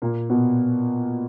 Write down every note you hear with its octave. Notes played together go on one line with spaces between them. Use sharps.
A#2 A#3
B2 B3